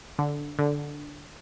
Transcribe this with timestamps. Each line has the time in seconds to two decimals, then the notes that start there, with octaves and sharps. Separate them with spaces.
0.19 D3
0.59 D3